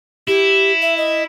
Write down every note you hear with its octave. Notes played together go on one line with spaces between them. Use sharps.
E4 G4
E5
D#5